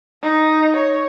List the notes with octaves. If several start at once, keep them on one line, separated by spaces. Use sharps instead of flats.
D#4
C#5